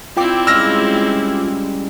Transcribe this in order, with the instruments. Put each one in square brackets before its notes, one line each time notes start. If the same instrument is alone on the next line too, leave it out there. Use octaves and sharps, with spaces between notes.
[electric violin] C4 E4 [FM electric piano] F4 G5 D6 [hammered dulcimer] D5
[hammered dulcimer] C#3 G3 G#3 [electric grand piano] E6 F6 A#6